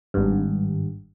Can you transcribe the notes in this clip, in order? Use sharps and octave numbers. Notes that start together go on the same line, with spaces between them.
G#1 G2